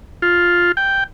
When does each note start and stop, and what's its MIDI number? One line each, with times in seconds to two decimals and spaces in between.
0.22 0.72 65
0.77 1.04 79